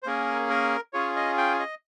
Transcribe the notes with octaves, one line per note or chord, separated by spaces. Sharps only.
C5
A#3 C#4 G#4 A#4
A#4
C#4 F4 G#4 C#5
D#5
G5
D#5